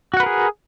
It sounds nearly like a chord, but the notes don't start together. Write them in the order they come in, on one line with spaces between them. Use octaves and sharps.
F#4 F#5 B4 A#4 G#4